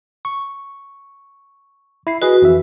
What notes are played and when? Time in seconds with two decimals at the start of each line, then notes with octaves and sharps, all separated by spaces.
0.25 C#6
2.07 E4 C7
2.22 F#4 G#4 B4 D#5
2.42 F2 E3 E5